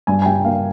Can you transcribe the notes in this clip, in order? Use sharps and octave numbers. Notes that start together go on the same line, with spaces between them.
G2 G#5
G#5
G2 G5
A#3 F5